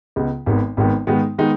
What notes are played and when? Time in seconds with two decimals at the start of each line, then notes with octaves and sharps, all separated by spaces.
0.16 C#2 C#3 B3
0.46 G#1 G#2 D#3 B3
0.77 G#1 G#2 D#3 B3
1.07 G#2 D#3 G#3 B3 D#4
1.38 D#3 G#3 B3 D#4